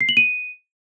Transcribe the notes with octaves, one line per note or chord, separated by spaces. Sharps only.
C7
F#7
D#7